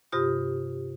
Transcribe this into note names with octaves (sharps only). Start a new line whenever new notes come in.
G2 C3 F4 G4 D#6